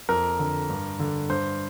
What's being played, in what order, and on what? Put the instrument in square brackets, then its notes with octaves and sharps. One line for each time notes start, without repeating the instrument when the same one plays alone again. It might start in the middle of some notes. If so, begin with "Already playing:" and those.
[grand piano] F2 A#4
D3
G2
D3
G2 C5